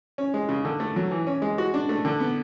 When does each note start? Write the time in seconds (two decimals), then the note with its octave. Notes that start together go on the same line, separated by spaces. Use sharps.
0.18 C#4
0.34 G#3
0.49 C#3
0.65 D3
0.80 A3
0.96 F#3
1.11 E3
1.27 C#4
1.42 G#3
1.58 F#4
1.74 D4
1.89 A3
2.05 D3
2.20 B3